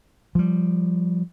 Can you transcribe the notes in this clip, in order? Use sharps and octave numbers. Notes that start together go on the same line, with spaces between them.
F3 G3